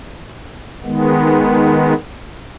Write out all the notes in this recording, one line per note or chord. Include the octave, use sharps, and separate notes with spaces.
D#3 G#3 B3